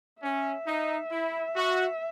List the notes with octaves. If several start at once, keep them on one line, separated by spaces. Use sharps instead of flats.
C#4 E5
D#4
E4
F#4